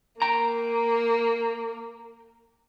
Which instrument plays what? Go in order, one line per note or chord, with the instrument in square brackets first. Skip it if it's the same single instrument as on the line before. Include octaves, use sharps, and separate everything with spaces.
[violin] A#3 [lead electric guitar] G5 A#5